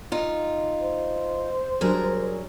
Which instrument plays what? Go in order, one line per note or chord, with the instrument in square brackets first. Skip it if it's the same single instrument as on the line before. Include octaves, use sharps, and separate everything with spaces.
[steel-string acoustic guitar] D#4 F4
[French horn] C5
[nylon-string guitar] F#3 G3 D4 [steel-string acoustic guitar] G#4 A#4